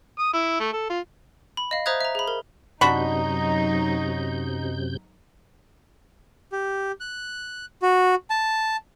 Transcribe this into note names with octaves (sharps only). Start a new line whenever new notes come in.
D#6
E4
A3
A4
F4
B5
D#5 F5
C5 E5 A#5 D#6 F#6 G#6
E5 A#5
G#4 B5
A#4
F#2 C3 F#3 D4 D#4 F#4 B5 G6
G4
F#6
F#4
A5